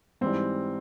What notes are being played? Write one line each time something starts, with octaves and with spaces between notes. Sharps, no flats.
G#2 E3 G3 C4